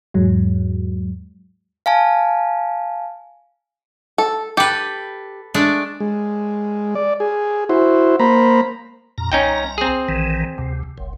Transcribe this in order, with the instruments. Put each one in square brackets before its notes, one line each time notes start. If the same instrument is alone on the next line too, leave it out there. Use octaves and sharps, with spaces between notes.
[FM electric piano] E2 G#2 F#3 G#3
[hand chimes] F5 G#5 A5
[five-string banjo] A4
[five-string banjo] G4 [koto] A4 B4
[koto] G#3 A3 D4
[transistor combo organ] G#3
D5
G#4
E4 F#4 C5
A#3 C5 A#5 B5
[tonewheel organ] F2 A#2 A#5
[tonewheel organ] C2 A#5 [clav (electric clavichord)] C#4 D#4 G5
[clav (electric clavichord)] C4 G#4
[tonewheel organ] A#1 D#3 E3
D2 C3
F#1 C2